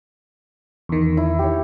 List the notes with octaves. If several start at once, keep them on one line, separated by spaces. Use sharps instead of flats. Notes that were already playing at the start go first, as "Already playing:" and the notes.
E2 D#3
E4
G4 C#5